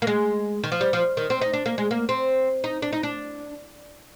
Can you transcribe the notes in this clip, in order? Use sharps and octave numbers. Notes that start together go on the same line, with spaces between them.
A#3
G#3
D#3
F3
G3
F3
D#3
C4
D#4
D4
A#3
G#3
A#3
C4
D#4
D4
D#4
D4